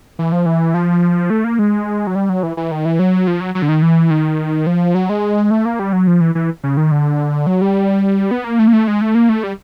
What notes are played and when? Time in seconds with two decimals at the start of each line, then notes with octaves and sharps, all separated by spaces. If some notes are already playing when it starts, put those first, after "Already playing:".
0.19 E3
0.32 F3
0.46 E3
0.74 F3
1.30 A3
1.44 A#3
1.59 G#3
2.07 F#3
2.15 G3
2.29 F#3
2.43 E3
2.57 E3
2.71 D#3
2.85 E3
2.99 F#3
3.27 F3
3.40 F#3
3.55 F#3
3.62 D3
3.69 D#3
3.82 E3
4.10 D#3
4.67 F3
4.95 F#3
5.09 G#3
5.51 A3
5.65 A#3
5.79 G3
5.93 F#3
6.07 F3
6.21 E3
6.35 E3
6.63 C#3
6.77 D#3
6.91 D3
7.47 F#3
7.61 G3
8.31 B3
8.44 A#3
8.59 A3
8.67 A#3
8.73 A3
8.88 G#3
9.01 A3
9.15 A#3
9.29 A3
9.44 G3